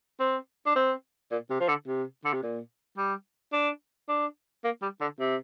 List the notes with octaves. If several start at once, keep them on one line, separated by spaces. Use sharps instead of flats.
C4
D4
C4
A#2
C3
F3
D3
C3
D3
C3
A#2
G3
D4
D4
A#3
G3
D3
C3